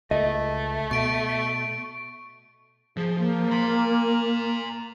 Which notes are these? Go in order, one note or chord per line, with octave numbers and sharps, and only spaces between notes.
C#2 A3 D#5
B2 C#6 D7
F3 G#4
A#3
A#5 C6